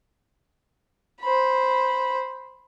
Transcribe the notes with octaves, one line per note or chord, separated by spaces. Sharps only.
C5 B5